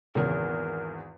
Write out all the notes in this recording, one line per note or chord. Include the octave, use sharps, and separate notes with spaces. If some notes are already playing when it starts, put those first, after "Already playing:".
G#1 E2 A#2 C#3 A#4